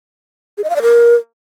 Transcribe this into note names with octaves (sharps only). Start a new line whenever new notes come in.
G#4
D#5
F5
D5
A#4